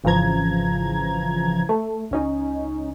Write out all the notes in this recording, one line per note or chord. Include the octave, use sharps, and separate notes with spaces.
G#1 C#3 E3 F3 A#5 G#6
A3
C#2 C#4 D#4